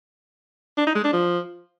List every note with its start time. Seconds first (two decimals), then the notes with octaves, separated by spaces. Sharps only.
0.78 D4
0.87 D#4
0.95 G#3
1.04 D4
1.13 F3